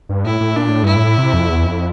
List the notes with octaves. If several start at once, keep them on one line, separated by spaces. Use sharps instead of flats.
G2
A2 E4
A2
A#2 D4
A2
G2 E4
A2
C3
F2
E2
F2